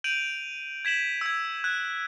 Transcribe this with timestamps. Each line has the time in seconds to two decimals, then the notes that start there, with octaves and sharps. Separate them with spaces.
0.04 G6 D7 D#7 F7 F#7
0.85 G#6 B6 E7 F#7
1.21 E6 G#6
1.64 F#6 G#6